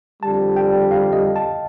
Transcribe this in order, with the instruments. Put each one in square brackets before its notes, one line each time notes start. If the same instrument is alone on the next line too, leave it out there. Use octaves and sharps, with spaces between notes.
[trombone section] F2 D3 G3 [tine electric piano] A5
[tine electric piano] G5
F5
D#5
A5